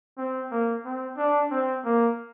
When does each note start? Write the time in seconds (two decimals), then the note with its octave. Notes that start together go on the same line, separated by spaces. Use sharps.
0.18 C4
0.52 A#3
0.85 C4
1.17 D4
1.51 C4
1.85 A#3